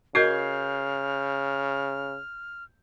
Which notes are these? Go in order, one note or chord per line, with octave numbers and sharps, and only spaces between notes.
C#3 F#4 A#4 D#5 F6 G6 G#6 C7